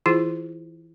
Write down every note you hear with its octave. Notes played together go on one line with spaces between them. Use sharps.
E3 E4 F4 G#4